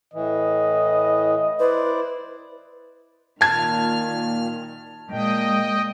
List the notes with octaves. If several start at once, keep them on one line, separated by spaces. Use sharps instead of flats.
A2 E3 D#5
E4 B4 C5 D5
A#2 D#3 A5 F6 G#6
A#2 G#3 D#5 G5